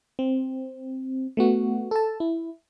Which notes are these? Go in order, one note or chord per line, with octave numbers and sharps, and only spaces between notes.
C4
A3 B3 F#4
A4 A5
E4